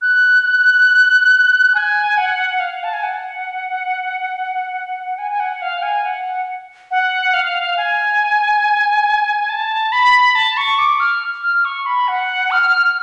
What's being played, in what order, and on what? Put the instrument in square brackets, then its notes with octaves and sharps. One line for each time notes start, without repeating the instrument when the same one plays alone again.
[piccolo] F#6
G#5
F#5
F5
A5
G#5
F#5
G#5
G#5
F#5
F5
F#5
G#5
F#5
F#5
F5
G#5
A5
B5
A5
C#6
D6
F6
F6
C#6
B5
F#5
F6